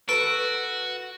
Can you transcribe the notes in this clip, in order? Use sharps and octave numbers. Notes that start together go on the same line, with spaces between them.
F#4 A4 B4 D7